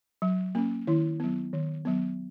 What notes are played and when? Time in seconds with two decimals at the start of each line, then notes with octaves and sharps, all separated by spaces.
0.22 F#3
0.55 A#3 C#4
0.87 D#3 E4
1.20 F#3 B3
1.53 D#3
1.85 F#3 B3